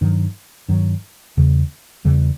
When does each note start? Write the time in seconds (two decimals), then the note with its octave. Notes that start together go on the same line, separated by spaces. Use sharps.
0.01 G2 D#3 F#3
0.68 G2 D#3 F#3
1.37 E2 C#3 E3 G3
2.05 E2 C#3 E3 G3